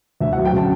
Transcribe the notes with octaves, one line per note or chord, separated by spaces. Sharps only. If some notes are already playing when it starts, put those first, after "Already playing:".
D2 E5
F#5
F#3
G5
C#3 A5